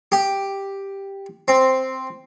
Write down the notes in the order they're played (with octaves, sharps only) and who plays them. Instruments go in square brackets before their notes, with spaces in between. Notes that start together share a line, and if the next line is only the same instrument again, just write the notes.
[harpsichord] G4
C4